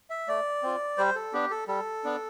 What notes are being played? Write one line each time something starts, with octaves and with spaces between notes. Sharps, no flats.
E5
A3 D5
C4 F4
G3 C5
A4
B3 D4 G4
A4
G3 A4
B3 D4